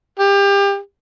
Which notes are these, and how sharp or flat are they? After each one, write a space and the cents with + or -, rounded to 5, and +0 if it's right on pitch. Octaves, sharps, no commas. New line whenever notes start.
G4 +30